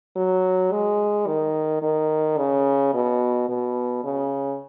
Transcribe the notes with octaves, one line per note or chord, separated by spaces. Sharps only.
F#3
G#3
D#3
D#3
C#3
B2
B2
C#3